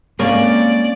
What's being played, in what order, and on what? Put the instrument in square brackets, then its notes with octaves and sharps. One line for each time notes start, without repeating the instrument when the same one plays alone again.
[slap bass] G#3 C4 [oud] A#3 [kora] C#4 [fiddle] D5